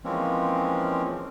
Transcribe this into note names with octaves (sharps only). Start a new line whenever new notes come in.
E3 F3 G#3 A#3 C4 C#4